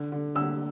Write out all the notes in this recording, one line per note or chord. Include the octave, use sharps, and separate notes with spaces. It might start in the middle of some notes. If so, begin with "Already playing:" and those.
Already playing: D3
D3
D3 E6